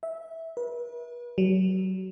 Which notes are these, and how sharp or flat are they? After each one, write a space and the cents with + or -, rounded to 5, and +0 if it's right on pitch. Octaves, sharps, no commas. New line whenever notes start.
E5 -15
B4 -40
F#3 +25